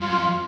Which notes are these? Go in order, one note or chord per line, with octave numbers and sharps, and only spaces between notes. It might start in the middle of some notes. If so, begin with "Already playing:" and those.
G2 F4
F#2
F4
F2
F4